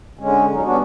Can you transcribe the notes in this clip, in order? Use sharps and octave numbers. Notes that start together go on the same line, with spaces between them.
D3 G#3 C#4
F#3 D#4
G3 B3 C#4 D4 F#4